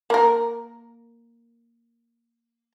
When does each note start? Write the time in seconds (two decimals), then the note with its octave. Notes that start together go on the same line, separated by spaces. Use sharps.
0.10 A#3 A#4